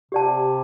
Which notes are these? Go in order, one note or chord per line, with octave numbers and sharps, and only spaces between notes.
C3 G4 D5 A5